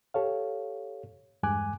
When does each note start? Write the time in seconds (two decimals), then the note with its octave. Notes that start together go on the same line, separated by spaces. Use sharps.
0.14 G4 A4 C#5 F5
1.43 E2 G2 G#3 G#5 D6 F#6